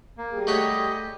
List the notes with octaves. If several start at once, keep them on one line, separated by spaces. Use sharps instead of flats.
A#3
G3 G#4
A3 F#4 G4 C#5 D#5